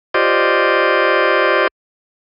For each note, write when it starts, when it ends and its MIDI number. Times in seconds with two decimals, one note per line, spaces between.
0.14 1.67 65
0.14 1.67 67
0.14 1.67 72
0.14 1.67 74
0.14 1.67 75